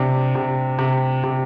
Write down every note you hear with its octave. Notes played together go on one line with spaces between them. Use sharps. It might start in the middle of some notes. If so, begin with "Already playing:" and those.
Already playing: C3 D4
C3
C3
C3